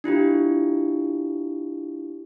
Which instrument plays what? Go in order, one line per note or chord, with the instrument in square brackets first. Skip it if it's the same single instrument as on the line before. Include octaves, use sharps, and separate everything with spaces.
[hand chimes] D4 E4 F4 G4